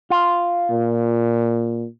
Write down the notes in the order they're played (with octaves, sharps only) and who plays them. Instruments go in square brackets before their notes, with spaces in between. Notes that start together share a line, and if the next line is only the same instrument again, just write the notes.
[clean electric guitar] F4
[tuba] A#2